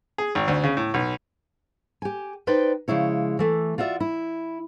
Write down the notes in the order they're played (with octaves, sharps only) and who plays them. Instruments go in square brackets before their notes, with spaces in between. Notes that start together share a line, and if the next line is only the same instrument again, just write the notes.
[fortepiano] G#4
G#1
D2
C#3
A2
B1
[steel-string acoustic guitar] G4 G#5
D#4 B4 C5 D5 G5
C#3 F3 G#3 E4 C#5
E3 A3
F4 F#4 D5 E5
E4